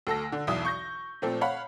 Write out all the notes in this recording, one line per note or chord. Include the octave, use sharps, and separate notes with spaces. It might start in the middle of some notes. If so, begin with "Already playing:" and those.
D2 A4 E6 A#6
D3
B1 E2 E5 D#6
C#6 G6 A#6
A#2 F3 A3 C4
C#5 F5 F#5 B5